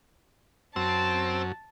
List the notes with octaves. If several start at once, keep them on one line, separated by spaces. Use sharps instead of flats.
F#2 C4 A5